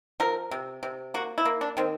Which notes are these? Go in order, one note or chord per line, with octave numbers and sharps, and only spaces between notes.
F3 A#4
C3
C3
A#3 F#4
E4
A#3
D4
D#3 C4